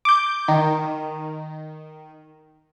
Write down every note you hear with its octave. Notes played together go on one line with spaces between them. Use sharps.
D6 G6
D#3